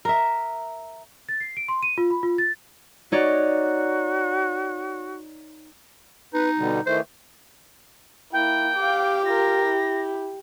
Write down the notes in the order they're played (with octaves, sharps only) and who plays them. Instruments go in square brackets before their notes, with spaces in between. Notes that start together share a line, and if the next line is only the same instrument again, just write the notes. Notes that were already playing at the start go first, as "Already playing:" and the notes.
[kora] A#4 E5
[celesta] A6
C7
D7
C6
D#7
F4
B5
F4
A6
[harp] D#4 C#5 D5 [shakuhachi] F#4
[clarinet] D#4 [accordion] B4
[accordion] B2 D3 G3
[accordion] D#3 E3 A3 [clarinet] C5
[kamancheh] A#3 E4 [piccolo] G5
[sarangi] G4 [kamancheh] F5 D6
[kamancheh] F4 A#4 [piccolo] A#6
[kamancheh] E4